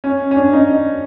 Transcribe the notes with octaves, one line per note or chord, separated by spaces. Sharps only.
C#4
C#4
D4
D#4